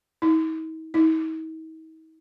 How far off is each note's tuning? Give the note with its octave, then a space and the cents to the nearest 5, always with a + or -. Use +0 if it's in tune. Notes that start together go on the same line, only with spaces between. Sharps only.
D#4 +45
D#4 +45